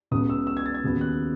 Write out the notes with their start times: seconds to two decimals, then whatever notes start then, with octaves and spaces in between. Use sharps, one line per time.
0.11 C#2 C#3 F#3 B3 D#6
0.30 E6
0.47 E6
0.57 G#6
0.66 A6
0.74 G#6
0.83 D#2 C#3 F#3 B3
1.01 F#6